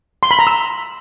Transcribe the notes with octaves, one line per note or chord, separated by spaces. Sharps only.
C6
B5
A#5
E6